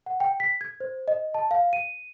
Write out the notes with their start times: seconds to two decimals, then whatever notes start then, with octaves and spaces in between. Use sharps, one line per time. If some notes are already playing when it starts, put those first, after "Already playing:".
0.06 F#5
0.20 G5
0.40 B6
0.61 G#6
0.80 C5
1.08 D#5
1.34 A5
1.51 F5
1.73 D#7